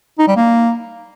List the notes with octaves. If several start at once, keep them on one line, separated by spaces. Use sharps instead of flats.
D#4
G3
A#3